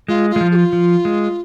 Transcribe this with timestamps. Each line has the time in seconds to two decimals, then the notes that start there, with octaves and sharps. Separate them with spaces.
0.08 G#3 F4
0.30 F4
0.36 G#3
0.41 F3
0.52 G#4
0.55 F4
0.73 F3
1.05 G#3